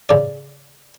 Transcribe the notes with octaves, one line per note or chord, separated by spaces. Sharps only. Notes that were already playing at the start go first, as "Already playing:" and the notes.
C#3 D5